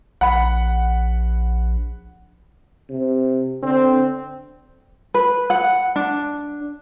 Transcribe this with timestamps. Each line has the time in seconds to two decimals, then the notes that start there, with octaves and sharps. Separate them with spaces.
0.21 A#1 F#5 B5
2.90 C3
3.63 D3 C4
5.14 B4
5.50 F#5
5.96 D4